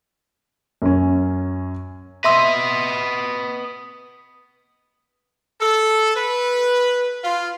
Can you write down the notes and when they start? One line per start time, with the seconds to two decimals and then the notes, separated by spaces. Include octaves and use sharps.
0.82 F#2 C#4
2.24 B4 D#5 E5 C6 E6
5.60 A4
6.14 B4
7.23 F4